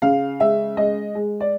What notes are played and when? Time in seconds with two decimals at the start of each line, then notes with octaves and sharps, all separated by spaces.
0.02 C#3 F5
0.40 G#3 E5
0.77 G#3 D#5
1.15 G#3
1.40 D5